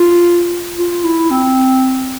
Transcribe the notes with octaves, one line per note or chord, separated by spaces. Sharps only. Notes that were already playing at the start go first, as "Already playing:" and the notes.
Already playing: F4
F4
E4
C4